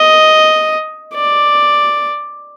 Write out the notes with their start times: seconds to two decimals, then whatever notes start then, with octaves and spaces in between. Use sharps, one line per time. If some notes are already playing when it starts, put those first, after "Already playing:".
Already playing: D#5
1.14 D5